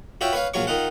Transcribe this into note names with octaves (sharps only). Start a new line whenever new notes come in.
F4 F#4 C#5 E5 G5
B4 C#5 F5
A#1 F#3 F4 C#5 C#6
D#3 D#4 F4 F#5